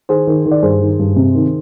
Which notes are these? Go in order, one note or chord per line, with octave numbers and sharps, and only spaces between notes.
D#3 G#4 C5
D#3
D#3
D5
G2 G#4 C5
D#3
G2
C3
D#3